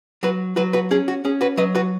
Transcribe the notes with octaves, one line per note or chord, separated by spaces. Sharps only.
F#3 F#4 B4
F#3 F#4 B4
F#4 B4
C#4 G#4
F#4
C#4 G#4
F#4 B4
F#3 B4 D#5
F#4 B4